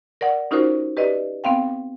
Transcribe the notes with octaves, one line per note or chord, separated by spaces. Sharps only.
A#4 D5 F#5
C#4 D#4 F4 F#4 A#4 C5
G4 B4 D5 D#5
B3 C4 F5 G5